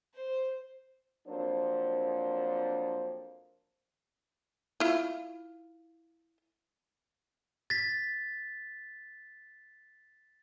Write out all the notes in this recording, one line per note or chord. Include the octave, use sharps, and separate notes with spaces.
C5
F2 F#3 A#3 D4 C5
E4 F4
A6 B6